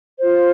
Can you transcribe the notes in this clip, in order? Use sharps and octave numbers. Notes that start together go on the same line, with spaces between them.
F4 C5